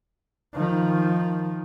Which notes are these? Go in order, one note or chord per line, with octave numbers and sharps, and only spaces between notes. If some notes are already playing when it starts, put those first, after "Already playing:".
D#3 F3